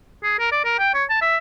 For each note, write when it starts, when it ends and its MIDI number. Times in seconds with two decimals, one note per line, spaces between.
0.23 0.35 68
0.39 0.49 70
0.52 0.61 74
0.65 0.78 70
0.79 0.93 79
0.94 1.04 73
1.10 1.20 81
1.22 1.37 76